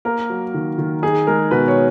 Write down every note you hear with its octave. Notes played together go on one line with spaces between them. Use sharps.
A#3 A#4
F#3
D#3
D#3
D#4 G#4
G#3 A#4
B2 B4
C#5